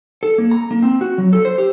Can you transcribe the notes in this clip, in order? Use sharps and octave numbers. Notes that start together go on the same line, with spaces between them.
A4
A#3
A#5
A#3
C4
F#4
F#3
A4
C5
G4